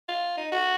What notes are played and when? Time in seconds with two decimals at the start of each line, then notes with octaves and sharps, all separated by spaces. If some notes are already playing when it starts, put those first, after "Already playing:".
0.08 F4
0.37 D#4
0.52 F#4